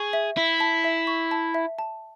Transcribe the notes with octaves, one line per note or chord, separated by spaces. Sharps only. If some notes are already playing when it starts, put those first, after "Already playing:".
Already playing: G#4 C#6
E5
E4 E5
A5
E5
C#6
A5
E5
A5